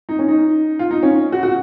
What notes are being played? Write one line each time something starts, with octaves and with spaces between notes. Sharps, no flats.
D#4
C#4
D#4
F4
D#4
C#4
F#4
F#4